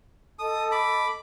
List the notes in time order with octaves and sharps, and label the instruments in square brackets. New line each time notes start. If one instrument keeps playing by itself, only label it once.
[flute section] A4 D#5 A5 [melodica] D#6
[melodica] B5 D6